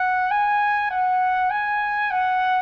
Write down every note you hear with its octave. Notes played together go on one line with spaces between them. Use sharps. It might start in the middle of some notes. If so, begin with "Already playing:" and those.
Already playing: F#5
G#5
F#5
G#5
F#5